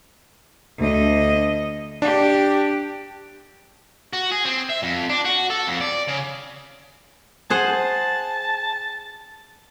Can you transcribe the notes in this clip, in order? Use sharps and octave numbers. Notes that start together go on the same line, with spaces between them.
D2 D#5
D4 G4
F#4
G#4
C4
E5
F2
D4
F#4
A4
F2
D5
C#3
G#4 C5 F#5 A5